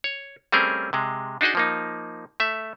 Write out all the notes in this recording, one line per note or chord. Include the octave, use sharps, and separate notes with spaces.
C#5
G3 A3 C4 C#4 G#4 A#4
C3 G#3
D4 D#4 F#4 G#4 D#5
F3 A#3 D#4
A3 E5